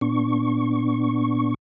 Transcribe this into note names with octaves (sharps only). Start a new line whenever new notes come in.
A#2 B3 D4 C#6